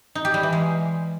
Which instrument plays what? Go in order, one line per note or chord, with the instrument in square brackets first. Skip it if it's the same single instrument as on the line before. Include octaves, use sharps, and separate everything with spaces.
[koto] D#4
G4
G3
E3
G#3